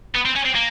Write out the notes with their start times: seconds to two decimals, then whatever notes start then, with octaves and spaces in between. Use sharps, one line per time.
0.15 B3
0.25 C4
0.35 C#4
0.45 C4
0.55 A#3